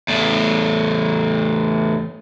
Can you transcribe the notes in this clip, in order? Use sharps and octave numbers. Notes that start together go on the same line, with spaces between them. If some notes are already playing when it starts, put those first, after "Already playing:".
E2 A2